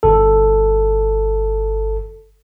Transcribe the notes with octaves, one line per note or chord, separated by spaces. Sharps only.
G1 A4